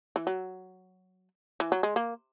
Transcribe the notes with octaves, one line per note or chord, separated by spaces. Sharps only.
E3
F#3
E3
F#3
G#3
A#3